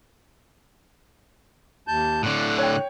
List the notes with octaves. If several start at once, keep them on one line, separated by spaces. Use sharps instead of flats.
D#2 A5 G6
A2 D3 F#6
C#5 G5